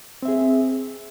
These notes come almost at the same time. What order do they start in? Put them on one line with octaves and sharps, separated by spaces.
C4 E5 G#4